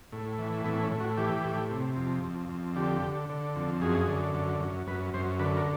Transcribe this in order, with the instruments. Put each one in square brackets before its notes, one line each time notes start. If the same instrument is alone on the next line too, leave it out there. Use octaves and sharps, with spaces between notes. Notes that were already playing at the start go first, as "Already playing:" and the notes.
[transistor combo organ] A2
E3
A2 B3
C#4
A2
F#4
E3 G4
A2
C3
F2
F2
F2
D3 G4
D3
D3
F2
F#2 G#4
D3
F#2
F#2
F#2 B4
F#2 C5
D3 B4
A#4